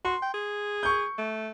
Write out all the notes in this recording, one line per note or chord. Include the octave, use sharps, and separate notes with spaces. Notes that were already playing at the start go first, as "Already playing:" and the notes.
F#4 C6
G5
G#4
C#6 G6
A3